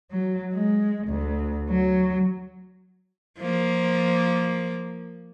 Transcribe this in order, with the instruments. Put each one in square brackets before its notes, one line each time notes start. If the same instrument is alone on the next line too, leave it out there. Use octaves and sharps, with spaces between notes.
[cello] F#3
G#3
D2
F#3
[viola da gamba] F3 A#3